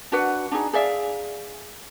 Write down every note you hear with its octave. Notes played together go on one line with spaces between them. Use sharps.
D4 F#4 B4 F#5
D4 D#4 G#4
G#4 D5 E5 F5